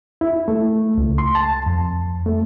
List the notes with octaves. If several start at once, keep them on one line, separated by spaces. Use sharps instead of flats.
E4
A3
C#2
C6
A5
F2
A3